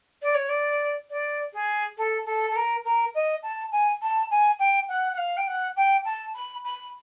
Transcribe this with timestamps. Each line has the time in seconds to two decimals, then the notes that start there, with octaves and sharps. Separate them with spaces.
0.22 D5
0.35 C#5
0.49 D5
1.10 D5
1.53 G#4
1.98 A4
2.26 A4
2.50 A4
2.56 A#4
2.85 A#4
3.15 D#5
3.43 A5
3.72 G#5
4.02 A5
4.31 G#5
4.59 G5
4.89 F#5
5.13 F#5
5.18 F5
5.37 G5
5.47 F#5
5.77 G5
6.05 A5
6.35 B5
6.65 B5